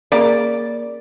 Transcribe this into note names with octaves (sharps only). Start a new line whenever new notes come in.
C#3 A#3 D5